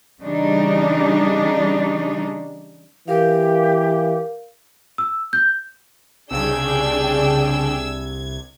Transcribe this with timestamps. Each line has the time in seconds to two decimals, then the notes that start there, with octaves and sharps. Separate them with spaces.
0.22 C#3 E3 G3 D4 D#4
3.08 E3 G4 A#4 F5
4.98 E6
5.33 G6
6.31 C2 C#3 D4 G#4 G5 E6 G#6